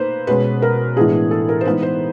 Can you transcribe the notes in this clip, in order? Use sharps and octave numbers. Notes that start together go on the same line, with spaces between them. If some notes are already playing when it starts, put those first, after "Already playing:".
Already playing: A#3 D#4 B4 C5
B2 G#3 C#4 B4
A#4
A2 E3 G#3 B3 D4 G#4
A4
A#4
C5
E3 G#3 B3 D#4 B4
C5